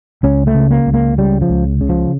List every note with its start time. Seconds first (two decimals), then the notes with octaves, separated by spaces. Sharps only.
0.23 C#2 C#4
0.47 A3
0.55 C#3
0.71 A#3
0.86 C#2
0.94 A#3
1.18 C#3 G3
1.42 F3
1.49 C#2
1.81 C#3
1.89 F3